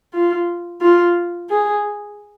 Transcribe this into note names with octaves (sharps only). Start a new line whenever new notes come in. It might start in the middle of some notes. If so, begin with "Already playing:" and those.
F4
F4
G#4